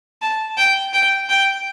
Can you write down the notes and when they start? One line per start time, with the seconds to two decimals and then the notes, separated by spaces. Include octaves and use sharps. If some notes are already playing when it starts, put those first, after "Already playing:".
0.22 A5
0.57 G5
0.93 G5
1.29 G5